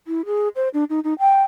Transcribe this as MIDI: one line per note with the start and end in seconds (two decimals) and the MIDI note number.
0.07 0.25 64
0.26 0.48 68
0.56 0.69 72
0.74 0.84 62
0.90 1.00 63
1.04 1.14 63
1.19 1.44 79